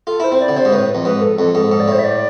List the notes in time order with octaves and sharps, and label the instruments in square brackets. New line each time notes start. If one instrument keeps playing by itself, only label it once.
[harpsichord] F4 [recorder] A4
[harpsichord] E4 [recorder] C5
[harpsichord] C4 [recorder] C5
[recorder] D5
[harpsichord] D3
[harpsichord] C3 [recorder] C5
[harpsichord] G#2
[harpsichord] A2 [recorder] B4
[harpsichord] F2
[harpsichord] G#2 [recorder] B4
[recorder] A4
[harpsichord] F2 [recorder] A4
[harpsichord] G#2 [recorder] A4
[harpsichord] G#2 [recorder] A4
[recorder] D5
[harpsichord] A2 [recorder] C5
[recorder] E5
D5